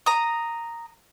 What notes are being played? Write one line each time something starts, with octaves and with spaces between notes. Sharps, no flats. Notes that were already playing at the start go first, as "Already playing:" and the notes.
A#5 D#6